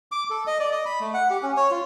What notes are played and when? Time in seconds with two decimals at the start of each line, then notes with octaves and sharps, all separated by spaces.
0.12 D6
0.30 A4
0.47 D#5
0.60 D5
0.72 D#5
0.85 B5
1.00 A3
1.14 F#5
1.30 G4
1.42 C#4
1.57 C#5
1.71 F4